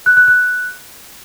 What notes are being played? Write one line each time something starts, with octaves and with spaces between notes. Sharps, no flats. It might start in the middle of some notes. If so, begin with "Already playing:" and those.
F#6
F#6
F#6